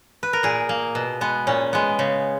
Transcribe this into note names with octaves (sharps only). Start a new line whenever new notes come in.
B4
A#4
A#2 G#4
A#3
B2
G#3 B3
A#2 C#4
G#3 B3
C#3